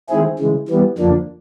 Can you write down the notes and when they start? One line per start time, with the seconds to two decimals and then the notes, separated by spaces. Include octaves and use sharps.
0.09 D#3 G#3 C4 E4 G#4
0.39 C#3 E3 G#3
0.68 E3 G3 B3
0.98 F2 D3 F3 A#3 D4